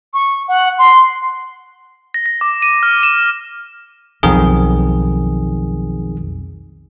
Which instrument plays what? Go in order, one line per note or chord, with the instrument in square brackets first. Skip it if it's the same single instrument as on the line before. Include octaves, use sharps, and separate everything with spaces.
[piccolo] C#6
F#5
C6
[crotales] A#6
A#6
D6
D#7
F6
E7
[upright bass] B1 [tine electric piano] F2 D#3 G#4